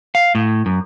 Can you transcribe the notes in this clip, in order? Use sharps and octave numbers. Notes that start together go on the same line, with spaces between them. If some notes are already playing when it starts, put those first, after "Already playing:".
F5
A2
F#2